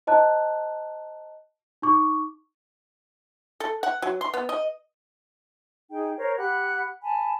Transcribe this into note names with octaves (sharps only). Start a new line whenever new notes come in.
C5 D#5 A5 A#5 F#6
D#4 C#6 D6
A4
F#5
F#3
C6
B3
D#5
D#4 G#4 G5
A#4 C5 C#5
G4 F#5 B5 F#6
G#5 A5 B5